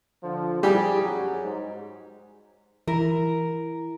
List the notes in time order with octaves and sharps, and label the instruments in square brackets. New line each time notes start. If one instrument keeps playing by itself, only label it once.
[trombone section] D3 F3
[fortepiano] G3 G4 [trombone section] G#4
[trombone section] F#2 F#3
G#2
[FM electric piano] E3 E4 [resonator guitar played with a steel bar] A#4